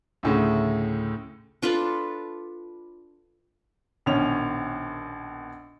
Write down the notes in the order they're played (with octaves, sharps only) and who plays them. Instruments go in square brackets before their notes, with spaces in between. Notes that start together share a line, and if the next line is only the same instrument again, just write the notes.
[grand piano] D2 A2 C#3
[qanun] D4 F4 A4 B4
[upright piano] A#1 B2 D#3 C#4 F7